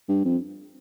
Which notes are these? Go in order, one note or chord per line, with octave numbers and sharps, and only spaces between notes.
G2
F2